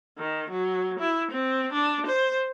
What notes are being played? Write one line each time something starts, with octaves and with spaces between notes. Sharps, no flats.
D#3
F#3
E4
C4
D4
C5